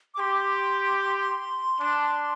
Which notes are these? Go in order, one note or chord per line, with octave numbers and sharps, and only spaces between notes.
D6
G4 C6
D4